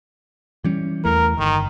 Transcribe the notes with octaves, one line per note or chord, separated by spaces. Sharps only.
E3 G3 C#4
E2 E3 A3 A#4
G1 D#3